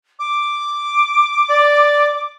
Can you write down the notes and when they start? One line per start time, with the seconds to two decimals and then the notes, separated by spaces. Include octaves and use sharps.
0.19 D6
1.50 D5